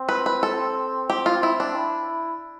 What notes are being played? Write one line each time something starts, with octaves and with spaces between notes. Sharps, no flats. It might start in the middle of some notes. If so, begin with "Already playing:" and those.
Already playing: C4
B4
B4
A4
G4
F4
E4
D4
E4